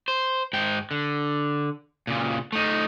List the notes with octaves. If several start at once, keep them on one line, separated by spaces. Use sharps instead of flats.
C5
G#2 G5
D3
A#2 C#3
A3 D#4